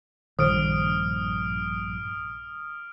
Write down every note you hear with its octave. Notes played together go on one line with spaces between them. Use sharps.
A#1 G2 D#3 D#6 F6 D7